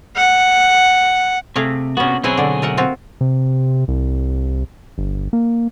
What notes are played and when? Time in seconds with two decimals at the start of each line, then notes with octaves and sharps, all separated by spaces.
0.16 F#5
1.56 C3 A3 G#4 F5
1.97 C3 B3 C#4 F#4
2.24 B1 C4 E4 G#4 B4 C#5
2.37 D3 D5
2.62 A3 A#4 F#5
2.77 C4 F4 F#4
3.21 C3
3.88 C2
4.98 G1
5.33 A#3